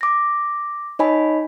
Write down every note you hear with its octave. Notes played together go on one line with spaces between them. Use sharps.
D6 A#6
D#4 C#5 D#5 G#5 B5